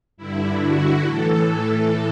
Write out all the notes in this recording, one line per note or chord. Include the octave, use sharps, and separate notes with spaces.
G2 D3 E4
F#4
A2 E3 A4
A4